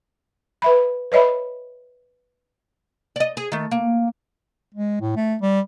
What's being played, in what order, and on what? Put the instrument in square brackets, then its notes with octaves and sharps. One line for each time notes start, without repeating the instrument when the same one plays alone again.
[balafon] B4 E5 B5
B4 C#5 D#5 E5 B5
[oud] D5 D#5
G#4
D#3 A3
A#3
[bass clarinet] G#3
A2
A3
G3